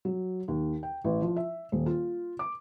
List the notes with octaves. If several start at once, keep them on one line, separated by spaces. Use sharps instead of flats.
F#3
D#2
G5
A1
F3
E5
D#1
F4
D6